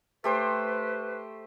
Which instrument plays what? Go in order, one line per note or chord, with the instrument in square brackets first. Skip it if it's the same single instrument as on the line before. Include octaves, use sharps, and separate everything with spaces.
[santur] A3 G4 C5 [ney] B4